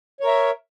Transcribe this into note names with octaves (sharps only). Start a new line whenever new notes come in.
A#4 C#5 E5